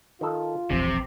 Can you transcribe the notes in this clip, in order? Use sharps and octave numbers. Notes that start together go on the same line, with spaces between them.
D#3 F4 A4
E1 A#1 E2 C3 G#5